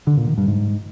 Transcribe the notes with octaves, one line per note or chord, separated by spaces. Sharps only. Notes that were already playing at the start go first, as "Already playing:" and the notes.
D3
A#2
D#3
G2
G#2